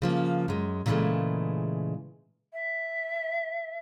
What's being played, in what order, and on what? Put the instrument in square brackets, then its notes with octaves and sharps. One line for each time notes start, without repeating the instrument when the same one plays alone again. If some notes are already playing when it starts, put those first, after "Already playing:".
[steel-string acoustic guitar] C#3 F3 A#3
F#2 G#3
A#2 C#3 E3 F#3 G#3 A3
[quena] E5